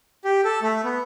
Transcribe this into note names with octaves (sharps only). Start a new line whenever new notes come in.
G4
A4
A3
B3